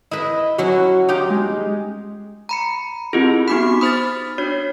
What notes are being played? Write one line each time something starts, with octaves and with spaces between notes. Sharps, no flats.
E4 B4 D#5
F#3 C#4 E4 F#4
D#4 F4 G4
G#3
A#5 B5 C#7
C4 E4 F4 G4 G#4
B3 D#4 F#4 B5 D6 B6
C5 B5 D#6 F6 A6
D4 F#4 C#5